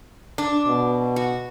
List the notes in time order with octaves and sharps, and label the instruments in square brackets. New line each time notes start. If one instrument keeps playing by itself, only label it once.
[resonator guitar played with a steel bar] D4
[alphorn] B2
[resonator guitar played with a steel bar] F#4